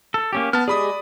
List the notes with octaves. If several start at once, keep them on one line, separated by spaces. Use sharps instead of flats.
A4
A#3 C#4 G4
B3 A5 F6
G#3 G4 G#4 D5 B5 D#6